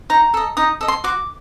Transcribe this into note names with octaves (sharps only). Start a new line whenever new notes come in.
D#4 A#5
A4 D#5
D#4 D#6
A4 D#5
C6
F#4 D6